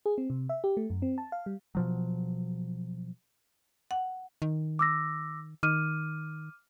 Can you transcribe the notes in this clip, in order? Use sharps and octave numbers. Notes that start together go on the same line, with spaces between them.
G#4
C4
C3
E5
G4
A3
F#2
C4
A5
F5
G3
B2 F3 F#3
F#5
D#3
D6 E6 A#6
D#3 D6 F6 D#7